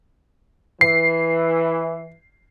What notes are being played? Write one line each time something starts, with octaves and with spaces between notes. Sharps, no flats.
E3 C7